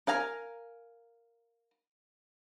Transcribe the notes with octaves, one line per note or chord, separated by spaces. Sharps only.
A#4 F5 G#5 A#5